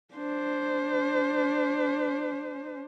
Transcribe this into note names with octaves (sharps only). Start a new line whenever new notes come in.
D4 C5